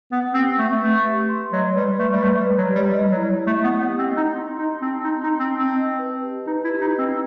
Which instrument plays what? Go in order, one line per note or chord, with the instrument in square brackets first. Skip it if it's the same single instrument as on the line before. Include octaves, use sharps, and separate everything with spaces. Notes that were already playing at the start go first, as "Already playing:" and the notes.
[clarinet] B3 [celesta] B4
[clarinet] C4 [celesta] G4
[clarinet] A3 [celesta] F#5
[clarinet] A3 [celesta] B4
[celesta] G4
C6
[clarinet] F#3 [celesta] D#5
[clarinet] G3 [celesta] B4
[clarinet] A3 [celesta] B4
[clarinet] G3
[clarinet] A3 [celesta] B4
[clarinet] G3
[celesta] B4
[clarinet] F#3
[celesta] G4
[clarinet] G3
[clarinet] G3 [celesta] D#5
[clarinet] F#3
[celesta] E4
E4
[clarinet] A3
[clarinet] B3 [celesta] E4
[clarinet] B3
[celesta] G4
[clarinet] C4
[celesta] D#5
[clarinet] D#4
[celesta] C6
[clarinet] D#4 [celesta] D#5
[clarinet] C4 [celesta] A5
[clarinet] D#4 [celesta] C6
[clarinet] D#4
[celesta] C6
[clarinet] C4
[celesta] A5
[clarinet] C4
[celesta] D#5
B4
G4
[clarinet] D#4 [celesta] B4
[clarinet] E4
[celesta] G4
[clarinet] D#4
[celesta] D#5
[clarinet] C4